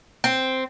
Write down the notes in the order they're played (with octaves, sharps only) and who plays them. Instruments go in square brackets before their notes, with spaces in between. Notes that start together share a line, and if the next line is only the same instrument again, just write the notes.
[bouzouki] C4